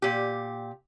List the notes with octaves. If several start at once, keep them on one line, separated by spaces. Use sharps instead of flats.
A#2 G4